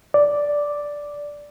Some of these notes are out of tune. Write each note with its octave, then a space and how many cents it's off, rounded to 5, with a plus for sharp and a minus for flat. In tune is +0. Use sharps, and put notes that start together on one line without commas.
D5 -5